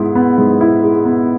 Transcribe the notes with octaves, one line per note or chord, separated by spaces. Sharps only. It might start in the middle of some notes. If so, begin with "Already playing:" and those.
Already playing: G#2 G#3 B3 E4
B3
G#2
E4
G#3
B3